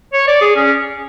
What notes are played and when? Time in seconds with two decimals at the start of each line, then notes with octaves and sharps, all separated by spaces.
0.13 C#5
0.28 D5
0.41 G#4
0.56 C#4